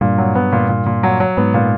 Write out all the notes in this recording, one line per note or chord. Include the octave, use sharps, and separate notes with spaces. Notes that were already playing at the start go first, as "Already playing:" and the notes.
G2 A#2
F#3
B3
A#2
A#2
A#2
F#3
F#3
G#2 B3
A#2